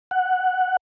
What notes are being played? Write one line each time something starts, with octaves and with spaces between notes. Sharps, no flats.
F#5